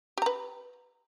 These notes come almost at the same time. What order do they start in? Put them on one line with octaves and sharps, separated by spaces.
G4 A#5 B4